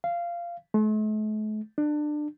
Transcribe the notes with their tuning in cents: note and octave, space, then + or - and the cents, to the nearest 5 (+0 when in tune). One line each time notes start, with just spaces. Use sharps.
F5 -15
A3 -45
D4 +25